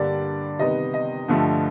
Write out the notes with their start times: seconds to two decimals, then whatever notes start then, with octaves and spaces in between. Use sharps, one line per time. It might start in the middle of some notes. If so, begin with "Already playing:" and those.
Already playing: G2 D3 G3 A#3 D5
0.59 C3 D#3 G3 B3 D#5
0.94 D#5
1.28 G2 D3 F3 A3